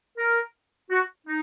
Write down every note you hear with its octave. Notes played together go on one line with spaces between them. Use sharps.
A#4
F#4
D#4